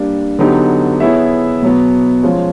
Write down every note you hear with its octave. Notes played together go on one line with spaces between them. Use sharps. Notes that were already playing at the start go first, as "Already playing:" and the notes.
Already playing: G3 A#3 D4
D3 F#3 B3 D#4 G4
B3 E4 G#4 C#5 E5
B2 F#3 B3
F3 G#3 C#4